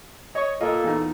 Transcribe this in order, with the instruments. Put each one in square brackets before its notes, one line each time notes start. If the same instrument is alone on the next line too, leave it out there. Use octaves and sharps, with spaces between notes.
[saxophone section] C#5 [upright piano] D#5
[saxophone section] A#2 A#3 A4 [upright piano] F4 D#5
[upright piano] E2 D#4